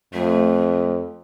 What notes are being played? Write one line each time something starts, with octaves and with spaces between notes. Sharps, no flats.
F2 A3